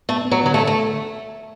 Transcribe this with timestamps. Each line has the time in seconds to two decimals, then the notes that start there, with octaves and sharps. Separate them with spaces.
0.09 A3 B3
0.25 B3
0.31 F#3
0.44 D3 F#3
0.54 A3
0.60 A4
0.67 A3